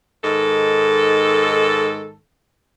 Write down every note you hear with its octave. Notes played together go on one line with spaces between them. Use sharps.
G#2 D#3 A4